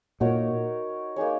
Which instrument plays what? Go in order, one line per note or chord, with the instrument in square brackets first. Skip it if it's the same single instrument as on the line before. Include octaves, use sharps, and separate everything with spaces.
[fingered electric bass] A#2 [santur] D#4 F#4 A#4 C#5
[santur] A#3 D#4 G#4 C#5